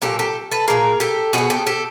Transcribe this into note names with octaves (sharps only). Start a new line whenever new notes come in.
A#2 F#3 A#3 G4 A4
G4 A4
A4 B4
A#2 F#3 A#3 G#4 A#4
G4 A4
B2 G#3 B3 F#4 G#4
G4 A4
G4 A4